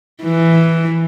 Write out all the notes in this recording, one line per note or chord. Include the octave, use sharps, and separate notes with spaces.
E3